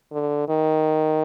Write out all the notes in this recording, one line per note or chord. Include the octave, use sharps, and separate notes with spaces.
D3
D#3